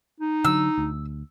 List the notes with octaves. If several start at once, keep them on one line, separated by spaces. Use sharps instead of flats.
D#4
D3 F#3 E6
D2